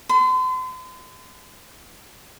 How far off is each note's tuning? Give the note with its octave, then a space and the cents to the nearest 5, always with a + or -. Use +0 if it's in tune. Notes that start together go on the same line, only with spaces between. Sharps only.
C6 -40